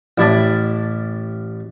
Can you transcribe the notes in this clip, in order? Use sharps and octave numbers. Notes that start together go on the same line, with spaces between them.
A1 E4 D5 E5 A5